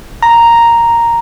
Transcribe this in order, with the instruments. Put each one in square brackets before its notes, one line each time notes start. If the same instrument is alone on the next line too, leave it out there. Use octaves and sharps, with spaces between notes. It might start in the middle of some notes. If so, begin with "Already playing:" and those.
[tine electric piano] A#5